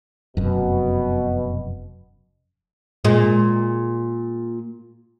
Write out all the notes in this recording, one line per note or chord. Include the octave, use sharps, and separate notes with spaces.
F1 F#2 B2
A#2 G#3